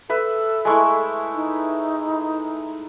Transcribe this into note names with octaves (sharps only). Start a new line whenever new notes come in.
A4 B4 E5
G#3 A3 E4
D#4